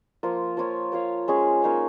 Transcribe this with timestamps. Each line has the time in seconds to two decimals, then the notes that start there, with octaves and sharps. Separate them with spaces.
0.23 F3 A#3 F4
0.57 F3 A#3 F4 C#5
0.92 A#3 F4 C#5 F5
1.28 G#3 C#4 G#4
1.62 A#3 D#4 C#5 F5